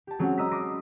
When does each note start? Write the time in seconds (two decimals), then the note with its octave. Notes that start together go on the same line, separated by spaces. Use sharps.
0.07 G4 A5
0.19 F#3 G#3 C4 C#4
0.38 D#5 A#5 D#6 E6 F#6 B6
0.51 B5 C6 D6 D#6 A#6